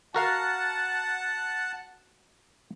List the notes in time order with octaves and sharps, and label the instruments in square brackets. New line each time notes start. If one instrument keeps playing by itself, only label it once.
[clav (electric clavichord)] F#4 A#4 F5 [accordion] F#5 A5